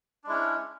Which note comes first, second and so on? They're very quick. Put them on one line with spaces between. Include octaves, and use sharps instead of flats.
D4 G#3 E4 C#4